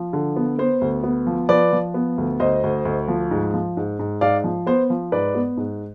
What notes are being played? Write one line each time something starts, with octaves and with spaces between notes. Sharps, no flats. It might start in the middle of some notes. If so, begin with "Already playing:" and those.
Already playing: F3
D3
B3
B3 C5
D2
B3
F3
F3 B4 D5
F3
B3
D2
D2 C5 D#5
D2
D2
F3
G#2
F3
G#2
G#2
G#2 D5 F5
F3
B3 C5
F3
G#2 B4 D5
B3
G#2